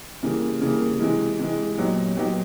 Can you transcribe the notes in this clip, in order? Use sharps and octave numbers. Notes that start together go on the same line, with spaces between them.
C#3 E3 G3 A#3
C#3 E3 G3 A#3
C3 E3 G#3
C3 E3 G#3
A#2 F#3 B3 D#4 G4
A#2 F#3 B3 D#4 G4